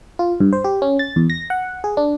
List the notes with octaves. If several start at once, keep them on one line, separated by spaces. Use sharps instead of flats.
F4
G2
C5
G4
C#4
A6
E2
A#6
F#5
G#4
D4